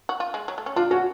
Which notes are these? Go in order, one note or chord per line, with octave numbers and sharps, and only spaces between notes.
F#4
F4
G#3
F#3
A3
C#4
D4 F4
C#4 F#4